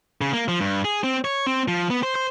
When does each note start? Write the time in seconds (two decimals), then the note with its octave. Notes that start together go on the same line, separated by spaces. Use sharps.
0.21 C#3
0.33 A#3
0.48 F3
0.61 G2
0.85 G#4
1.04 C4
1.25 C#5
1.47 C4
1.68 F3
1.90 B3
2.03 C5
2.15 C5